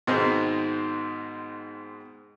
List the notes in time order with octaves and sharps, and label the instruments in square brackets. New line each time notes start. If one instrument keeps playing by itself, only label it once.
[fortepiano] G#2 B2 D#3 G#3 C4 D#4